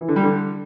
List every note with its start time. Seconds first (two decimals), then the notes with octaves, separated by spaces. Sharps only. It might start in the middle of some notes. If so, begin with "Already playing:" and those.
0.01 E3
0.08 D3
0.16 G3
0.24 D3